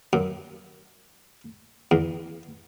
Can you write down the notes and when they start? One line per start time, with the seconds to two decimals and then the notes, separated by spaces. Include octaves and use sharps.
0.13 F#2
1.91 E2